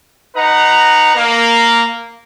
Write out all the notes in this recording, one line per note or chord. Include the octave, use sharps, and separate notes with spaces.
D#4 B4 F#5 A#5
A#3